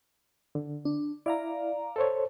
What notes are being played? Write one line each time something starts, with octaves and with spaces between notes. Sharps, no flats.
D3
D4
E4 D5 F5 A#5
A4 C5 C#5